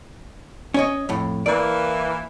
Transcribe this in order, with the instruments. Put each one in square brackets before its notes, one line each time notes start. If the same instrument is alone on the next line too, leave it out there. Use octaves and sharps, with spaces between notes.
[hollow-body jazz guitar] C#4 C#5 D#5
F2 A2
[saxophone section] E3 A#3 [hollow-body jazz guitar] D5